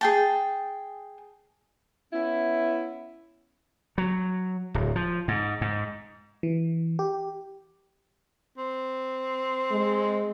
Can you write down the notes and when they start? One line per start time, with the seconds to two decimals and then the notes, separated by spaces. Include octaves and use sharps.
0.01 G#4 G5 A5
2.13 B3 C#4 E4
3.98 F#3
4.74 D1
4.96 F3
5.28 G#2
5.61 G#2
6.43 E3
6.99 G4
8.57 C4
9.72 G#3